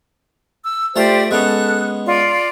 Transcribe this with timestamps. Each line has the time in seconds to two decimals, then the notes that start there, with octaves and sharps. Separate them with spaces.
0.65 E6
0.96 A3 F4 G4 C5 D5 A5
1.31 G#3 B3 C#4 A4 F#6
2.06 F4 D5